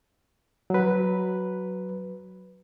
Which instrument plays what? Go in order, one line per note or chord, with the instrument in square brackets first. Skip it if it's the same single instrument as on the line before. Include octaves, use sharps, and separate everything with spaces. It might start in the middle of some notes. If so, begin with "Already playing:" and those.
[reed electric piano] F#3 B4